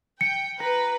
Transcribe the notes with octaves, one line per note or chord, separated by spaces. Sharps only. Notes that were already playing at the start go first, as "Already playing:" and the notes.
G5 C#7
B4 A#5